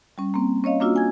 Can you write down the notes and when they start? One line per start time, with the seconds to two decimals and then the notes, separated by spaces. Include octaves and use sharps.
0.18 G3 C#4
0.34 A#3 C4
0.64 C#4 C#5 D#5 F5
0.80 A#3 D4 F4 F#4 E6
0.96 G#5 G#6